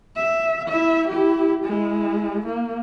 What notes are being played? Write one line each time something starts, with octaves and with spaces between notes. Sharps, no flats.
E5
E4 E5
E4 G4
G#3 E4
A#3